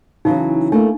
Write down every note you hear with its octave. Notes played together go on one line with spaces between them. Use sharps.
C#3 E3 F#3 D#4
A3 A#3 D4 E4